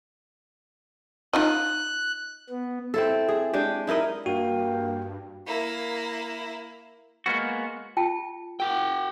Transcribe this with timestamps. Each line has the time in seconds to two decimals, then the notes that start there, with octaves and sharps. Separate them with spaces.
1.33 D#4 F4 D#5 F#6
2.50 B3
2.94 C4 E4 A4
3.29 G#4
3.53 G#3 D4 G4
3.87 D#4 E4 A#4 D#5
4.26 G2 A#3 F#4 G5
5.47 A#3 E4
7.26 G#3 A#3 B3 F#4
7.97 F4 G5 A5
8.60 F#4 A#4 G5